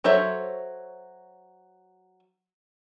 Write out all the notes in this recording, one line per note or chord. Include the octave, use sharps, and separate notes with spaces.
F#3 A4 C5 C#5 E5